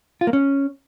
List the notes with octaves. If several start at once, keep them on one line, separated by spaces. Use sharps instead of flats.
F4
A#3
C#4